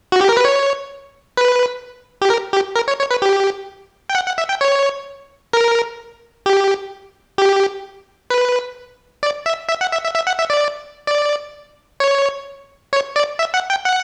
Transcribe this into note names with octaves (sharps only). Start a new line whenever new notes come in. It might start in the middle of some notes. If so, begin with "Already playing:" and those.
F#4
G4
A#4
B4
C#5
B4
G4
A#4
G4
A#4
C#5
C#5
B4
G4
G5
F#5
F#5
E5
G5
C#5
A#4
G4
G4
B4
D5
E5
E5
F#5
E5
E5
E5
F#5
E5
D5
D5
C#5
C#5
D5
E5
F#5
G5
F#5